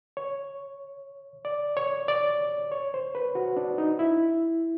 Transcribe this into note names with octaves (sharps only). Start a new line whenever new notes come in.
C#5
D5
C#5
D5
C#5
C5
B4
F#4
D4
D#4
E4